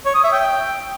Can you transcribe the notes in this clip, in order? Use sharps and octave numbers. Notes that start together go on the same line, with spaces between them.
C#5
D#6
E5
G5